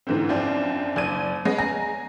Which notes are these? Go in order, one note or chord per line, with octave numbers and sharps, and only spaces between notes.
G#2 D3 E3 A3 C4
F#2 F3 C4 D4
F#1 D5 G#6 D#7
G#3 B3 C#4
G#5 A#5 A#6